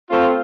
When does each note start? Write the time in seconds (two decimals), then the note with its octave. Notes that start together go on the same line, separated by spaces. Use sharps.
0.10 A3 C4 F4